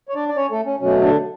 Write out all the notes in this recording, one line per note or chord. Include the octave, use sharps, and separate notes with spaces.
C#5
D4 D5
D5
C#4 C#5
A3 A4
C#4
B2 F#3 A3 C#4
D3 D4